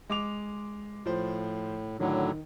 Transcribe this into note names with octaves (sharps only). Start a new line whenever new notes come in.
G#3 D6 F7
A2 F3 C5
A2 D3 D#3 F#3